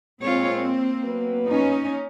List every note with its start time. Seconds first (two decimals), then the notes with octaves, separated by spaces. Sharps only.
0.22 A#2 G#3 C4 F4 C#5
0.61 A#3
1.04 F#3 B3 B4
1.48 C#4 D#4